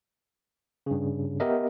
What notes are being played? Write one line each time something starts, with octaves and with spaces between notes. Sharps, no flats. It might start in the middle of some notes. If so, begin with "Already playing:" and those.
G2 C#3
B3 G4 A#4 D#5 E5